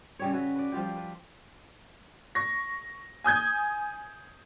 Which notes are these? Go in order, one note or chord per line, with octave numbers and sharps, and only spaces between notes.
C#3 G3 C#5
F#4 B4 C#5 E5
B4 D5
F3 G3 F4 G5
B4
C#6 A#6
G#5 D#6 G6 G#6